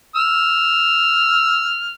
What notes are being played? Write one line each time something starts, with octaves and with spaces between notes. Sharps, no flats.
E6 F6